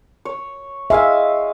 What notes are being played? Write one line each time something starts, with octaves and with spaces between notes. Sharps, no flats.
C#5
G#3 E5 F5 G#5